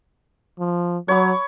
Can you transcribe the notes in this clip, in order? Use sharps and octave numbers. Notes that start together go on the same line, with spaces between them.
F3
F#3 C#5 B5 D6